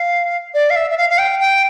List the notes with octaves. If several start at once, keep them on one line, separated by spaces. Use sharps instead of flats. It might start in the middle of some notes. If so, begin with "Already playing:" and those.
Already playing: F5
D5
F5
E5
E5
F5
F5
G5
G5